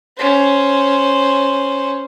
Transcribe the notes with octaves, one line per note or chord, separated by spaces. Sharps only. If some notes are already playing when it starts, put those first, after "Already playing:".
C#4 C5